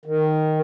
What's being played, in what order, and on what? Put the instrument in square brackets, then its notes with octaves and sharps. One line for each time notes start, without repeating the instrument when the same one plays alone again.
[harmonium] D#3